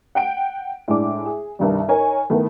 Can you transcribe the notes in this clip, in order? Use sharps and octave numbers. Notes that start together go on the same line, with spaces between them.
F#5 G5 D7
A2 G#3 D4 D6
G#4
C2 G2 D#3 G3
D#4 A#4 C#5 G#5
D#3 A3 B3 E4